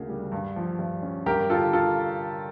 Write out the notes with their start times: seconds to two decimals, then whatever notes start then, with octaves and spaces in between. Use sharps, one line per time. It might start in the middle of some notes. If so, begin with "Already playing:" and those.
Already playing: D2 C#3 A#3
0.09 G3
0.32 G2
0.56 F3
0.79 G2
1.03 C#4
1.26 G2 G4 A#4
1.49 D3 F4 A4
1.73 F4 A4